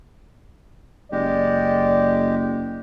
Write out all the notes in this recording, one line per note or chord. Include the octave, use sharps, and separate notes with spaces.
F#1 G#3 G4 D5